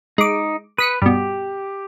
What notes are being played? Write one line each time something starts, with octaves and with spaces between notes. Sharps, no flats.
G#3 D#4 D6
B4 D#6 B6 C#7
G2 B2 G4